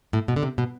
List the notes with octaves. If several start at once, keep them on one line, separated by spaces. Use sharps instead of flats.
A2
B2
D3
C3
B2